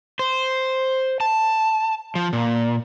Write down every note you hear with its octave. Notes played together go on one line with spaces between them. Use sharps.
C5
A5
F3
A#2